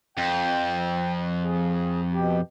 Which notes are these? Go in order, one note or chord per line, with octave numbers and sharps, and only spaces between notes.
F2 G5
G#4
B2 G4